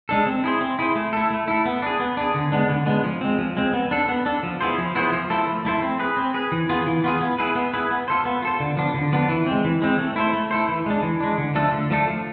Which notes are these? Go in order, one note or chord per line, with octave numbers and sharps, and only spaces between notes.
G#3 D4 A4
C4
E4 G#4 C5
C4
E4 G#4 C5
A3
E4 A4
A3
E4 A4
B3
D4 G#4
B3
D4 G#4
D3
G#3 B3 D4
D3
G#3 B3 D4
F3
G#3 C4
F3
G#3 C4
B3
D4 A4
B3
D4 A4
F3
B3 E4 G#4 C5
F3
B3 E4 G#4 C5
F3
A3 E4 A4 C5
F3
A3 E4 A4 C5
C4
G#4 B4
C4
G#4 B4
E3
B3 F4 G#4
E3
B3 F4 G#4
B3
E4 G#4 B4
B3
E4 G#4 B4
B3
F4 A4 C5
B3
F4 A4 C5
D3
F3 B3 D4
D3
F3 B3 D4
E3
G#3 C4
E3
G#3 C4
A3
E4 A4 C5
A3
E4 A4 C5
E3
G#3 D4
E3
G#3 D4
D3
F3 A3 D4 A4
D3
F3 A3 D4 A4
F3